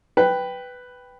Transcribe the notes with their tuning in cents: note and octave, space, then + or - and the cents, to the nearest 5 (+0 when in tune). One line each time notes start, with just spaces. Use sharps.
B4 +5 G5 +0